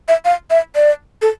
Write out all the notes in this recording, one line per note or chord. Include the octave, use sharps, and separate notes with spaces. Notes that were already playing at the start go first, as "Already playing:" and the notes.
E5
F5
E5
D5
A4